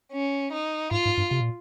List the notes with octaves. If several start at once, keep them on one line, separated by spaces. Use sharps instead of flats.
C#4
D#4
G#2 F4
G#2
G2
C3
A#2